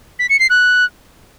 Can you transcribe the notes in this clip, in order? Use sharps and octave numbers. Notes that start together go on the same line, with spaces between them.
B6
C#7
C7
F#6